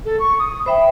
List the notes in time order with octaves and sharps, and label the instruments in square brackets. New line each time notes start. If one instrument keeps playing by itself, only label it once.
[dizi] A4
C#6
D#6
[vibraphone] C5 E5 G5 [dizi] B5